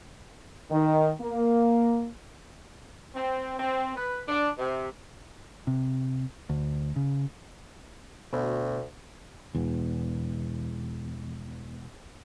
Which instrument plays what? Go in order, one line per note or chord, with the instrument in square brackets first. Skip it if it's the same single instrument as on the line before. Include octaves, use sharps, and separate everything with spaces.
[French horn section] D#3
A#3
[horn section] C4
C4
B4
D4
C3
[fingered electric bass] C3
D2
C#3
[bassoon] D2 [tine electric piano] B2
[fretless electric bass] E1 E2